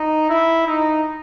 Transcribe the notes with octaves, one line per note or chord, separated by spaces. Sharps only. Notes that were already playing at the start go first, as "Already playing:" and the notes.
Already playing: D#4
E4
D#4